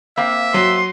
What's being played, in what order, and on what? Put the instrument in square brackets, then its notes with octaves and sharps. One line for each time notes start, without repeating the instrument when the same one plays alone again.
[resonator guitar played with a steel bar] A#3 C4 F5 [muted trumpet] E5
[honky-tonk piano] F#3 [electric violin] C6